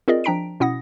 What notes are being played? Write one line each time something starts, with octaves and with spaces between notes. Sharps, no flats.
C4 F4 G#4 A#4 D5 D#5
F3 D4 G5 A#5 B6 D7
B2 C#4 E4 F#5 D#6 A#6